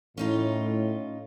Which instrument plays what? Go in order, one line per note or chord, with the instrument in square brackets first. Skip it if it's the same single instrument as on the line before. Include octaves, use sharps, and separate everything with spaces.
[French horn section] A2 [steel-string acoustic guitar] C#4 D#4 F4